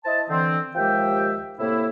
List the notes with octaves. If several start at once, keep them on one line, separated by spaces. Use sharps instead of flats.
E4 C5 D#5 A5
D3 E3 C4
D#2 F3 G#3 G4 E5 G5
A2 C3 A#3 E4